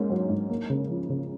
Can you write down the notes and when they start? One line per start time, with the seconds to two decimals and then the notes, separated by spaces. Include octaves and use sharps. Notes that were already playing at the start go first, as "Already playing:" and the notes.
Already playing: G#2 A#3 C#4
0.10 F#3
0.30 G#2
0.50 A#3
0.70 C#3
0.89 F3
1.10 C#3